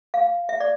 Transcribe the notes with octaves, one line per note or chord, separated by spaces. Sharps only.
F5
E5
D5